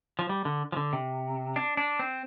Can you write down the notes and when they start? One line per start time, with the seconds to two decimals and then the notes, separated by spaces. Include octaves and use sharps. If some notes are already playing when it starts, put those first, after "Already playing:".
0.19 F3
0.29 G3
0.45 D3
0.72 F3
0.77 D3
0.93 C3
1.56 D4
1.77 D4
1.99 C4